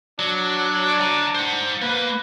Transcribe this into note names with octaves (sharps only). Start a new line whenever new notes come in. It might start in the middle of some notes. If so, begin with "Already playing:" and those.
F#3 D4
G5 A#5
C5 F#5
A#3 B4